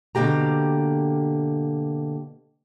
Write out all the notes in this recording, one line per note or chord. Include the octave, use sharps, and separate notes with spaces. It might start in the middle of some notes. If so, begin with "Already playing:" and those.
B2 D3 A#3 G4 A#5